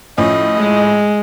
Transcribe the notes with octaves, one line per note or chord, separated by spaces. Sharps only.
A2 F3 C#4 D#5
G#3